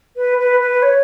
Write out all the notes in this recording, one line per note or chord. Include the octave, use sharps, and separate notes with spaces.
B4
B4
B4
C#5